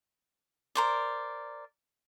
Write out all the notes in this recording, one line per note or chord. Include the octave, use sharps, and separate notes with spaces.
A#4 C5 D5